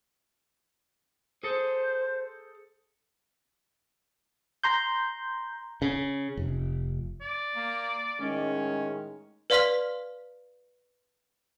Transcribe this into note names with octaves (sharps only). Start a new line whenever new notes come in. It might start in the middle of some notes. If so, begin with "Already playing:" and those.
G#4 A4 C5
A#5 C6 G6
C#3
F1
D5
A#3
A2 D#3 G#3 C#4
B4 D5 F5 C6 F6 B6